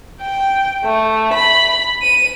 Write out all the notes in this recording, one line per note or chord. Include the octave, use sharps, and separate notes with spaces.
G5
A3
B5
D#7